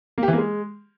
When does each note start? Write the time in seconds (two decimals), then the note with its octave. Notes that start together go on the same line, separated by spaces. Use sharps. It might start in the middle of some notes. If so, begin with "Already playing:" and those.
0.18 A#3
0.23 G4
0.28 E3
0.33 A#3
0.38 G#3